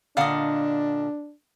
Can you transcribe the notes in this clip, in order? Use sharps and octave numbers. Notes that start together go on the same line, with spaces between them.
A#2 D3 D4 D#5 F5 F#5